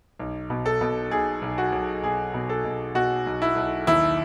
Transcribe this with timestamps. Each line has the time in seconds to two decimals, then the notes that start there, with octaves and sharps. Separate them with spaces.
0.20 B1
0.50 B2
0.66 A4
0.81 B2
1.11 B1 G#4
1.42 B1
1.58 F#4
1.72 B1
2.03 B2 G#4
2.34 B2
2.49 A4
2.65 B2
2.95 B2 F#4
3.26 B1
3.42 E4
3.56 B1
3.87 D#2 E4